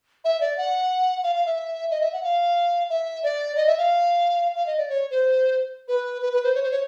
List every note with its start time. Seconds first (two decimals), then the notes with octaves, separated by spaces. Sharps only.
0.24 E5
0.41 D5
0.57 F#5
1.23 F5
1.35 F5
1.46 E5
1.91 D#5
2.01 E5
2.13 F#5
2.24 F5
2.90 E5
3.23 D5
3.56 D#5
3.67 E5
3.78 F5
4.56 F5
4.66 D#5
4.78 D5
4.89 C#5
5.11 C5
5.88 B4
6.22 B4
6.33 B4
6.44 C5
6.55 C#5
6.63 C5
6.71 C#5